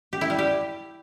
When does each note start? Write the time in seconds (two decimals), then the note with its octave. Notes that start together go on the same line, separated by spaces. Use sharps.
0.13 G4
0.21 E4
0.30 G3
0.39 G4